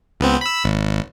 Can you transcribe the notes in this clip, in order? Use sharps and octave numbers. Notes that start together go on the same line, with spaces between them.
C#2 B3 C4
B5 E6
G#1